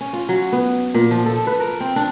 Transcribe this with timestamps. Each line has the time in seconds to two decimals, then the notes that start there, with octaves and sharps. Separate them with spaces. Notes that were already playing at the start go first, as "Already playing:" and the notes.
0.01 C#4
0.13 F4
0.29 F#3
0.52 B3
0.95 A#2
1.11 F3
1.26 A4
1.47 B4
1.60 A#4
1.80 C4
1.96 D4